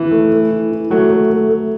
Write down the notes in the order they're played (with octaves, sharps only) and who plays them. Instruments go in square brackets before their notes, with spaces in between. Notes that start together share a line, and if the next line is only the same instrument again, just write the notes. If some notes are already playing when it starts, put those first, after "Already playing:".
Already playing: [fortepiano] E3 [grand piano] E4
[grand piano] A3
A3
E4
E4
[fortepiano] F#3 [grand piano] A3
[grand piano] A3
A3
A3